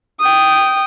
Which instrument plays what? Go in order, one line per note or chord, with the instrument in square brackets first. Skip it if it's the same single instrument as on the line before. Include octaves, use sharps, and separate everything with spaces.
[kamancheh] G5 D#6